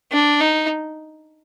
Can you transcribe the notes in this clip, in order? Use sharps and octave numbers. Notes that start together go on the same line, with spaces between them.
D4
D#4